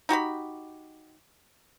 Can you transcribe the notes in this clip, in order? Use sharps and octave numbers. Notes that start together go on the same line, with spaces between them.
D#4 F#4 G4 B5